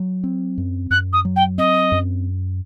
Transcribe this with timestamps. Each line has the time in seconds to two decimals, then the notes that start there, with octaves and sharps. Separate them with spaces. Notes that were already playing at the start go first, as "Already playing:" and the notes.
Already playing: F#3
0.24 C4
0.58 F#2
0.90 F#2 F#6
1.13 D#6
1.25 F#3
1.36 G5
1.58 C4 D#5
1.92 F#2